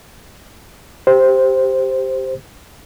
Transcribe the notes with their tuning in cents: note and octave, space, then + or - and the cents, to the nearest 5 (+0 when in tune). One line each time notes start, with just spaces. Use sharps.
G4 +0 C5 +0